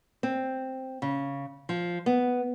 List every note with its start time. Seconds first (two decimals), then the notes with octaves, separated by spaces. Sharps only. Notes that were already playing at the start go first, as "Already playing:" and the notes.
0.23 C4
1.02 C#3
1.69 F3
2.06 B3